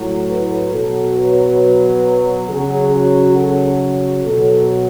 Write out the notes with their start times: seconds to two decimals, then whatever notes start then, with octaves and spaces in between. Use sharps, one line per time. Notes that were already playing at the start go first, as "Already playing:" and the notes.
Already playing: A2 F#3
0.28 B4
0.73 B2 F#3 A4
1.17 B4
2.49 C#3 F#3 G#4
2.93 F#4
3.36 A4
4.25 B2 F#3 A4